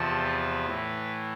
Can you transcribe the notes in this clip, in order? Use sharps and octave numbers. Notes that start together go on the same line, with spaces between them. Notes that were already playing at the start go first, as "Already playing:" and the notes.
Already playing: E2 C3 F3 A5
B4
A2 E3